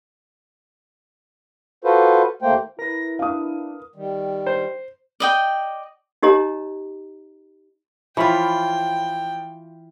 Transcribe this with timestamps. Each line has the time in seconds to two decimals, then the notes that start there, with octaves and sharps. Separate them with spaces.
1.84 F4 F#4 A4 B4 C5
2.42 D#2 A3 A#3 C5 G5
2.79 E4 A#4 B4 A#6
3.19 D4 F5 D#6
3.96 D#3 G3
4.47 C5
5.20 D5 D#5 G5
6.22 D#4 G4 C#5 D#5 A#5
8.17 E3 F3 F4 C#5 G5 B5